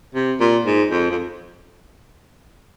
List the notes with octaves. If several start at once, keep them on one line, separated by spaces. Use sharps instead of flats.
C3
A#2
G#2
F2
F2